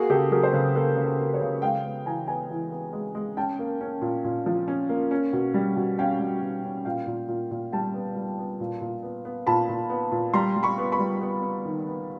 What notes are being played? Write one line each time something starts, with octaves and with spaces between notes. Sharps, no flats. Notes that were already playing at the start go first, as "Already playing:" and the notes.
Already playing: A#3 F#4 G#4
C#3 G4 A4
F#3 G#4 A#4
C5
C#3 A4 B4
A#3 A4 B4
C#3
A4 B4
A#3
B4 C#5
C#3
G#3 F5 G5
B3
E3 G#5 A#5
B3 G#5 A#5
E3
B3
G#3
G#3
C#4 G5 A5
A#3
C#4
A#2
A#2
F3
C#4
A#3
C#4
B2
G3
B2
C#4 F5 G5
G3
B2
C#4
A#2 F5 G5
A#2
A#2
A#2
G3 G5 A5
B3
G3
B3
A#2
A#2
B3
B3
A#2 A5 B5
A#2
B3
A#2
G3 A#5 C6
G3
B5 C#6
B3
B5 C#6
G3
B3
B3
D#3
B3